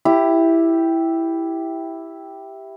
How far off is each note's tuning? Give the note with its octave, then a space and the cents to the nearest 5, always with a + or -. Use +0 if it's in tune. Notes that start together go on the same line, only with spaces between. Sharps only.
E4 +0 G4 +0